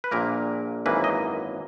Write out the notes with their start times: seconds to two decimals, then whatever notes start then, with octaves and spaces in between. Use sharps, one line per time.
0.04 B4
0.11 A#1 A#2 A#3 A#4
0.86 G#1 F#2 E3 A#3 B4
1.04 D#5